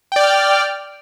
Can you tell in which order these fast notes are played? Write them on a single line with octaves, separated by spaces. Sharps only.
G5 D5 F6